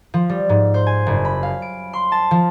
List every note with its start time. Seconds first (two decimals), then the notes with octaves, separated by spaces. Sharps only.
0.14 F3
0.29 G3
0.49 G#2
0.74 C5
0.87 G#5
1.06 F#1
1.25 B5
1.43 F5
1.62 D7
1.93 C6
2.12 A5
2.31 F3